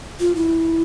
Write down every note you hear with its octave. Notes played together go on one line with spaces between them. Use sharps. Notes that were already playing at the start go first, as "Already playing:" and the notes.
F4
E4